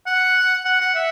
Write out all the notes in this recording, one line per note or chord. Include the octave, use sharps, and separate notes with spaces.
F#5
F#5
F#5
E5